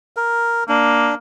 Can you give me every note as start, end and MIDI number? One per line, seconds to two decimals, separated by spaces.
0.17 0.64 70
0.69 1.14 58
0.69 1.15 62